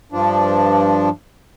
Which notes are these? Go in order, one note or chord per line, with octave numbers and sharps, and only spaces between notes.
G2 F3 D4